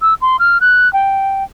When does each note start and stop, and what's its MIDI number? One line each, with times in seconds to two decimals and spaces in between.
0.02 0.14 88
0.22 0.37 84
0.39 0.58 89
0.61 0.91 90
0.93 1.44 79